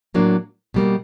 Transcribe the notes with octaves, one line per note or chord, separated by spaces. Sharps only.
A2 F#3 A#3 D4
B2 G3 A#3